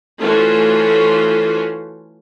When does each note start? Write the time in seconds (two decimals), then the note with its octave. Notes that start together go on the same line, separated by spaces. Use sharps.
0.19 E3 A3 C#4 F4 F#4 C5